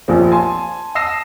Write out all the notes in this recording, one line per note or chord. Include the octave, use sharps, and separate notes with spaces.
A#1 D#2 F3 C4
G#5 A5 C6
A5 D#6 E6 A#6 C7 E7